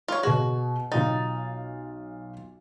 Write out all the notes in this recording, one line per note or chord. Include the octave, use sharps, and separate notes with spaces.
F4 C#5
B2 F#4 G#4
B1 D#4 F4 A6